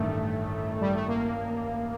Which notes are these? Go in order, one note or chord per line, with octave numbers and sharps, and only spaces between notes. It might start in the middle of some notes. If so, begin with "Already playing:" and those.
Already playing: A1 G2 D#3 A3
G3
A3
A#3